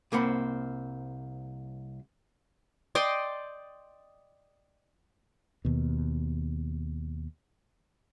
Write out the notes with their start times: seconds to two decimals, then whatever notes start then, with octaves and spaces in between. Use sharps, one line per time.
0.12 C2 A#3 C4 F#5 B5
2.95 D5 D#5 G5 C6
5.65 D#2 B2